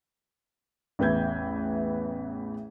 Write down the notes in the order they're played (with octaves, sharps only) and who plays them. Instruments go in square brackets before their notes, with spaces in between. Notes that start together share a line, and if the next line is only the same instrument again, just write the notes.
[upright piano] A1 E2 B4 E5 G6 G#6